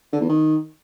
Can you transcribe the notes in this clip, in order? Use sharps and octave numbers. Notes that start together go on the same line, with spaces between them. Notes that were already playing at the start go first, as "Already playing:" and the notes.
D3
E2
D#3